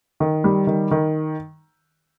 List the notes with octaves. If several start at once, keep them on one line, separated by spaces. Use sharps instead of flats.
D#3
G3
D#3
D#3